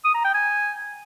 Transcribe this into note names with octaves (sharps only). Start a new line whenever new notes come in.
D#6
A#5
G5
G#5